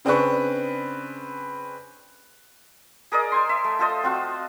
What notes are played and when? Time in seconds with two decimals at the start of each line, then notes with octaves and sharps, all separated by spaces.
0.05 C#3 C4 D4 G#4 B4 C#6
3.12 G#4 A#4 D5 D#5
3.32 C5 G#5 C6
3.49 E5
3.64 A3
3.79 F4 A4 C5 D#5
4.03 C4 F4 F#4